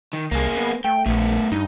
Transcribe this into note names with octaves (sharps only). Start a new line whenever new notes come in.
D#3
C2 A#3 G#4
B3
A3 G5
A#1 A3 B3
G2 D#4